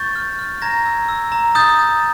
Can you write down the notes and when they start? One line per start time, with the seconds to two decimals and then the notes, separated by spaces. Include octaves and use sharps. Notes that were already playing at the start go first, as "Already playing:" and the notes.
Already playing: C#6 G6 A6
0.16 F6
0.39 F6
0.62 A#5 G#6 A#6
0.86 E6
1.08 E6
1.32 A#5
1.55 D#6 G6 A6
1.79 D#6